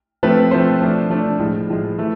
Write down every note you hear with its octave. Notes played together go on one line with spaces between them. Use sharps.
F3 A3 C4 B4
F3 A3 C4 C5
F3 A3 D4
F3 A3 D4
A2 F3 G#3
A2 F3 G#3
E3 A3